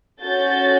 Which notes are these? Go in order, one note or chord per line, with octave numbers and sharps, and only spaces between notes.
C#4 F#4 A4 G6 A6